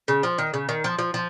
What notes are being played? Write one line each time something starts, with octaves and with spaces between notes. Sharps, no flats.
C#3
F3
D#3
C#3
D#3
F3
F3
F3